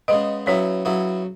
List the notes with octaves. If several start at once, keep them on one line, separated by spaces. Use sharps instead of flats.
C#3 G#3 B3 D#5
C#3 F#3 B3 E4 C#5
C#3 F#3 B3 E4